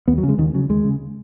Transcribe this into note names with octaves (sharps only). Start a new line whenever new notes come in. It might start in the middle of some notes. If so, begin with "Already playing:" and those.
D#2 B3
F#3
C#3
G#3
D#2 D#3
C#3 F#3
D#2 G#3
C#3